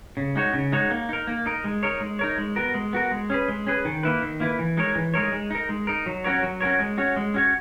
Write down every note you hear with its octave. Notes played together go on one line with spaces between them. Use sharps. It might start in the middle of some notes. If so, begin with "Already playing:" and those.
C#3
G#3 D#4 F#4 C#5
C#3
G#3 D#4 F#4 C#5
A#3
D#4 A#4
A#3
D#4 A#4
G#3
D#4 A#4 C#5
G#3
D#4 A#4 C#5
G#3
B3 F#4 A#4
G#3
B3 F#4 A#4
G#3
C#4 G#4 B4
G#3
C#4 G#4 B4
D#3
A#3 E4 B4
D#3
A#3 E4 B4
E3
G#3 D#4 A#4 C#5
E3
G#3 D#4 A#4 C#5
G#3
D#4 A#4
G#3
D#4 A#4
F#3
C#4 F#4 A#4 C#5
F#3
C#4 F#4 A#4 C#5
G#3
C#4 F#4 C#5
G#3
C#4 F#4 C#5